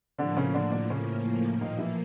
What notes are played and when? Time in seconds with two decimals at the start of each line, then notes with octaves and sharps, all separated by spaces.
0.18 A2 D3 F3 A#3 D4
0.37 C#3 C#4
0.54 D3 D4
0.72 D3 D4
0.90 C#3 C#4
1.61 A#2 D#3 F3 A#3 D#4
1.78 E3 E4